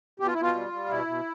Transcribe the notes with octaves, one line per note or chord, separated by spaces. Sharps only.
B2 G4
F4
E4
B2 F4
G3
G3
B2 E4
B2